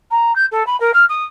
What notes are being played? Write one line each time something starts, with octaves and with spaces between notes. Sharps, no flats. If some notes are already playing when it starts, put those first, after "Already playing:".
A#5
G6
A4
B5
A#4
F6
D#6